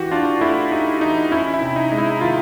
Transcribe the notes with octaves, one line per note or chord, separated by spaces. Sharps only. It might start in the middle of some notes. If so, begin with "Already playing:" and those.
Already playing: E3 F#4 G4
D4 F4
A3 E4
D#4 G4
E3 D#4
C#4 E4
E4
C3
D#4
G#3
E4
D#3 F4